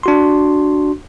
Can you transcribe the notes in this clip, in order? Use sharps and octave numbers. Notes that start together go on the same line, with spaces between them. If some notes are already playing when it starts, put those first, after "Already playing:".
D4 F#4 C6